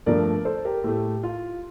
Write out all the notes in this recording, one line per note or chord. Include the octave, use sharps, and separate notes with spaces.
G2 F3 A3 A#4 D5
A4 C5
G4 A#4
A2 A3 G4
F4